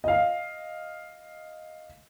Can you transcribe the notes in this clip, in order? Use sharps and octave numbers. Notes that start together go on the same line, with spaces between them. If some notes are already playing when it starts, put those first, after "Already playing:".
D#5 F5